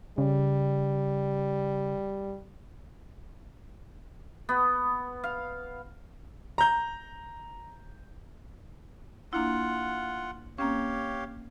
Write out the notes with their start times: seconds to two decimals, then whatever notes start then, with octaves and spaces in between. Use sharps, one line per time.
0.18 C#3 G3
4.49 B3
5.24 F5
6.58 A#5 G6
9.33 A#3 D4 E4 F4 F#5
10.58 A#3 C4 C#4 G4 C#5 F5